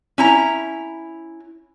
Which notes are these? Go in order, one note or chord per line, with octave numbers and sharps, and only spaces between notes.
C#4 E4 A#5